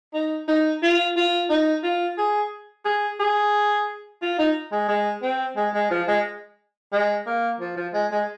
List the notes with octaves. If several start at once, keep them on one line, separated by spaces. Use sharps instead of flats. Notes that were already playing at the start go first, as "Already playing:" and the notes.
D#4
D#4
F4
F4
D#4
F4
G#4
G#4
G#4
F4
D#4
G#3
G#3
C4
G#3
G#3
F3
G#3
G#3
A#3
F3
F3
G#3
G#3